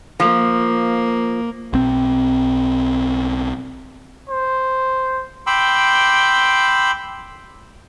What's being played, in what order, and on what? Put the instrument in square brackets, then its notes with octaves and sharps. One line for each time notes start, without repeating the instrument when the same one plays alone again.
[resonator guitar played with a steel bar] F3 [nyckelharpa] A#3
[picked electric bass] B1 C4
[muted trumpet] C5
[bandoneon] G5 B5 C6 D6 E6